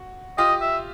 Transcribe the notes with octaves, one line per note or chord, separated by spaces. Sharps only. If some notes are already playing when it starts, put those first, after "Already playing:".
Already playing: F#4
F4 G4 D#5
E5